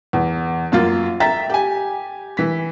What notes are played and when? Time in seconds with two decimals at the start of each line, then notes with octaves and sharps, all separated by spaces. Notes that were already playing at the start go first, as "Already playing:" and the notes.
0.13 E2
0.72 F#2 A#3 F4 A6
1.20 E5 G5 A#5 A6 B6
1.50 G4 G#5
2.37 E3 B6